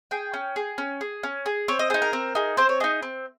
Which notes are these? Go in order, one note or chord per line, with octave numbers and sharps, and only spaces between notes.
G#4 G5
C#4
G#4
C#4
G#4
C#4
G#4
C4 C#5
D#5
D#4 G#4 C5
A#4
C4
D#4 G#4
C4 C5
C#5
D#4 G#4 D#5
C4